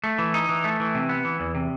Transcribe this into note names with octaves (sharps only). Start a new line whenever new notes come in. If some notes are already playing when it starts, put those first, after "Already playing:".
A3
E3
D#4
E3
A3
E3
C3
B3
E3
E2
C3